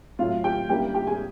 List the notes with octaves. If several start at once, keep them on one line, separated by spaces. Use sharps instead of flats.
A2 F#3 A3 F4 F5
G4 G5
D3 G3 A#3 C#4 E4 G4 G5
G4 G5
G#4 G#5